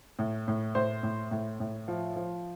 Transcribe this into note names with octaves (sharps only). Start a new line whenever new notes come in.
A2
A2
A2 C5
A2
A2
A2
F3
F3